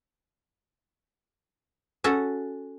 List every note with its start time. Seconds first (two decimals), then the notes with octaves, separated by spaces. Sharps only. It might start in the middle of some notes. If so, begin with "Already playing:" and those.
2.04 C#4 F#4 A4